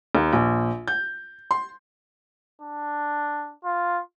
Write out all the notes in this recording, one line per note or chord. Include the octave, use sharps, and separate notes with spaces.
D#2
A#1
G6
C6
D4
F4